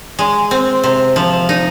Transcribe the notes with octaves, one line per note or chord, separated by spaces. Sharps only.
G#3
C4
C3
F3
D#4